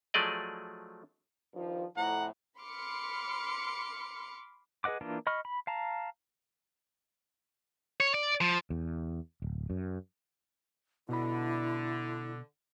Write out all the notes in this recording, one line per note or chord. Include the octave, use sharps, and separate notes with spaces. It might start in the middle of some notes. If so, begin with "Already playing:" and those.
F3 F#3 A3 G#4 D5 D#5
G2 D#3 F3
F2 A2 F#5 A#5
B5 C6 D6 F6 C#7
G#4 B4 D#5 F#5 D6
E3 A#3 D4 F4
D#5 B5 C#6 F6
B5
F5 A5 A#5
C#5
D5
F3
E2
D1
F#2
B2 D3 E4 B5